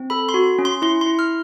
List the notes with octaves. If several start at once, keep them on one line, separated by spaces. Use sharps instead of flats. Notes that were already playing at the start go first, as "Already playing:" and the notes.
Already playing: C4
A4 B5
C6
F#4
C#4
C6
E4 C6
C6
E4
F6